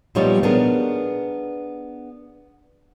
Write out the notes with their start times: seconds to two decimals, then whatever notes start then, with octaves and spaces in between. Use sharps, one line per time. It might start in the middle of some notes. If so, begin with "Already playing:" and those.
0.15 A#2 F3 G3 B3 D#4 C#5
0.43 B3 D4 G#4 A#4